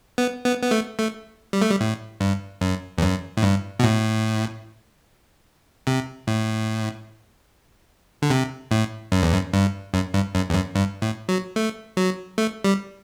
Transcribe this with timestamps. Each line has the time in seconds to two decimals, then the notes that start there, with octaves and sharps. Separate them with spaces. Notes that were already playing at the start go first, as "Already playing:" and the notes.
0.18 B3
0.45 B3
0.62 B3
0.71 A3
0.99 A3
1.53 G3
1.62 A3
1.70 G3
1.81 A2
2.20 G2
2.61 F#2
2.98 E2
3.02 F#2
3.37 A2
3.42 G2
3.79 B2
3.84 A2
5.87 C3
6.27 A2
8.22 D3
8.30 C3
8.71 A2
9.12 F#2
9.22 E2
9.33 F#2
9.53 G2
9.94 F#2
10.14 G2
10.35 F#2
10.50 E2
10.54 F#2
10.75 G2
11.02 A2
11.29 F#3
11.56 A3
11.97 F#3
12.38 A3
12.64 G3